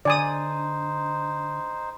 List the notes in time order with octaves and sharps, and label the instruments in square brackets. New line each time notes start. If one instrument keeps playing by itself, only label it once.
[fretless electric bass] D3 [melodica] D#4 C5 [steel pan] D5 G#5 D#6